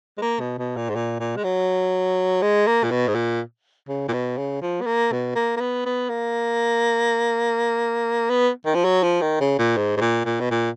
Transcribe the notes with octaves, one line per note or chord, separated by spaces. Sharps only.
G#3
A#3
B2
B2
A#2
G#2
A#2
A#2
G#3
F#3
G#3
A#3
A#2
B2
G#2
A#2
C#3
A#2
B2
C#3
F3
B3
A#3
B2
A#3
A#3
B3
B3
A#3
B3
D#3
F3
F#3
F3
D#3
C#3
A#2
G#2
G#2
A#2
A#2
B2
A#2